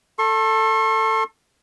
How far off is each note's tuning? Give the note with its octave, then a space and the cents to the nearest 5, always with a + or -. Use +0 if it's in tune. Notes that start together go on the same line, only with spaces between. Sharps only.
A4 +15 C#6 -45